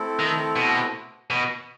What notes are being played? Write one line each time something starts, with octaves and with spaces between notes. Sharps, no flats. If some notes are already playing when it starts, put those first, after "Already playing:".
Already playing: A3 C4 E4 A4
D#3
B2
B2